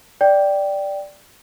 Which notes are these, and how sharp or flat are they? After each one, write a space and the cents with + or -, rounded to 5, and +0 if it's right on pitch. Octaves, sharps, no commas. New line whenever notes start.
D5 +0 G5 -5